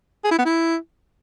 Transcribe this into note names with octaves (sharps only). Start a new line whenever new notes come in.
G#4
E4
B3
E4